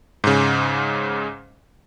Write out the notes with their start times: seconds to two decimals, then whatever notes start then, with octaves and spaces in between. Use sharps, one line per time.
0.24 G#2 C#3